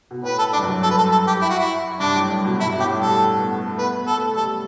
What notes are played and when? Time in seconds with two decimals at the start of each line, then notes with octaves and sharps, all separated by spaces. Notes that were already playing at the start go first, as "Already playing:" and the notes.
0.11 B2
0.23 A2 B4
0.38 A4
0.53 D4
0.57 G2
0.63 F#2
0.83 F#2 A4
0.91 B4
0.97 A4
1.11 A4
1.27 G4
1.41 E4
1.50 F#4
1.59 E4
2.00 G2 D4
2.15 A2
2.30 G2
2.45 B2
2.60 G2 E4
2.72 B2
2.79 A2 G4
2.99 G3 A4
3.39 B3
3.58 A3
3.78 B3 B4
3.97 B3
4.07 A4
4.17 A3
4.36 G3 A4